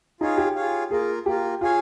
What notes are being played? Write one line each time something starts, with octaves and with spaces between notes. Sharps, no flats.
D#4 F4 G#4 C#5 F5
G4
F4 G#4 C#5 F5
A#3 F4 G#4 A#4
A#3 F4 G4 A#4
F4 G#4 C#5 F5 G#5